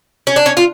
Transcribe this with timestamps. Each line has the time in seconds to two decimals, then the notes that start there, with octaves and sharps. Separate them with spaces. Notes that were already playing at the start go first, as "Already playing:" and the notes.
0.27 C#4
0.36 D4
0.46 C#4
0.57 F4